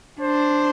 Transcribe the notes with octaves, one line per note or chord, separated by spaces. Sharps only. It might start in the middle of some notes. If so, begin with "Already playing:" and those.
D4 C5